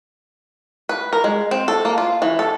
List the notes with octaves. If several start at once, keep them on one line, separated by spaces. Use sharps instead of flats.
B4
A#4
G#3
C4
A4
A#3
F4
E3
A4